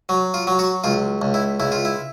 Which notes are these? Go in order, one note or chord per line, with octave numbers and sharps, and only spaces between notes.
F#3
F4
F#3
F#4
C#2 F4
C#2
E4
C#2 E4
F4
E4